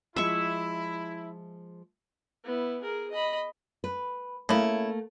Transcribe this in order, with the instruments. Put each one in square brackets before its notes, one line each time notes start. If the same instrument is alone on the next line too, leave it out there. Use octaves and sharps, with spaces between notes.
[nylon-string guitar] F3 G#3 [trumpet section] E4 [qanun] E5 C#6
[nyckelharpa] B3 E4
G#4 A#4
D#5 B5
[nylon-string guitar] B4
[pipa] C#3 E4 [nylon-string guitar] A3 A#3